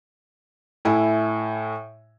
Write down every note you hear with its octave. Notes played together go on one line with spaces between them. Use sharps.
A2 E4 G#5